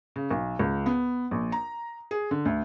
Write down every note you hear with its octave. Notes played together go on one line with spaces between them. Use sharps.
C#3
B1
C#2
B3
A#1
A#5
G#4
D3
D2